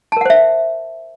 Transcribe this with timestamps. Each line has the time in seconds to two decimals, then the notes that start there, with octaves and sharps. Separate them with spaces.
0.12 A5
0.17 A#4
0.21 F#5
0.25 C5
0.30 E5